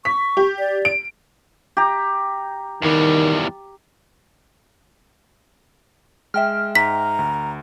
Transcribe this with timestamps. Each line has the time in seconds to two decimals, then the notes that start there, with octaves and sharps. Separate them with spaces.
0.05 C#6 B6
0.37 G4
0.59 D5
0.85 D7
1.77 G4 A#5
2.82 E2 D#3 G3
6.34 G#3 E5 G5 F6
6.75 G#2 A#5 B6
7.19 D2